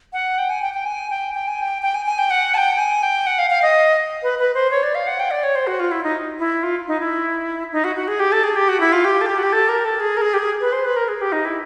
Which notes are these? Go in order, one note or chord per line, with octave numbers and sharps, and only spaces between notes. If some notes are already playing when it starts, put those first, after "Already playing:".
F#5
G5
G#5
G5
G5
G#5
G5
G5
G#5
G5
G5
G#5
G#5
G5
F#5
A5
G5
G#5
G5
F#5
F5
F5
D#5
B4
B4
C5
C#5
D5
F5
F#5
G5
D5
C#5
C5
F#4
F4
E4
D#4
E4
F4
D#4
E4
D#4
F#4
F#4
G#4
G4
A4
G#4
G4
F#4
E4
F4
G4
A4
G4
F#4
G4
A4
A#4
A4
G#4
A#4
G#4
G4
G#4
B4
C5
B4
A#4
G#4
G4
D#4
E4